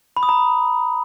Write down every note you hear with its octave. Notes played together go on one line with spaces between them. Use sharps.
B5
D#6
A#5